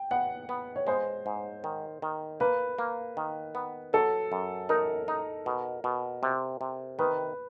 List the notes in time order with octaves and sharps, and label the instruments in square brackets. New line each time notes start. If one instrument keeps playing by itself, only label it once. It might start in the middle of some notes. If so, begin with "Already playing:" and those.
Already playing: [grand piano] G5
[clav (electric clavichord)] B3 [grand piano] F#5
[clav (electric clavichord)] B3
[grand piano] C#5
[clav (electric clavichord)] G#3 [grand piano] C5
[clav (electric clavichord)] G#2
D#3
D#3
[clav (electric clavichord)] A#3 [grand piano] B4
[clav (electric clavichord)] A#3
D#3
B3
[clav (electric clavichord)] F#3 [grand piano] A4
[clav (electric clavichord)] F#2
[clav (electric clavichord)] D#4 [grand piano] A#4
[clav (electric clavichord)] D#4
B2
B2
C3
C3
[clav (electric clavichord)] D#3 [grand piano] B4